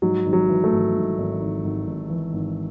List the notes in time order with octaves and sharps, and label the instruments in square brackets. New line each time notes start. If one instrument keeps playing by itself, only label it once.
[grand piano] G#2 F#3
G#1
F#3
E3
A3
G#1
G#2
G#1
G#1
G#1
G#1
E3
G#1